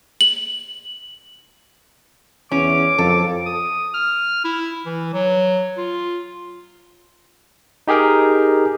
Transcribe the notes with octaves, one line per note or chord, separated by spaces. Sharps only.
F#7
E2 C#4 D6
F2 A4
D#6
F6
E4
E3
F#3
F4
D#4 G4 G#4 A#4 G5